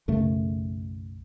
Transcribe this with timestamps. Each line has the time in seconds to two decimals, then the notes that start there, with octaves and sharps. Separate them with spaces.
0.08 B1 F#2 C#3 A3